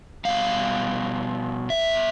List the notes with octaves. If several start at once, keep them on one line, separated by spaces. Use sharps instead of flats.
B2 G3 F5
E5